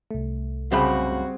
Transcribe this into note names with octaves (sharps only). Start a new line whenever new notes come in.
C2 A3
F#2 C#3 G3 C4 F#4 G#4 B5